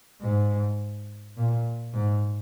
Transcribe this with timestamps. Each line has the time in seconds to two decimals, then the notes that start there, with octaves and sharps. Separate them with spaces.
0.21 G#2
1.37 A#2
1.93 G#2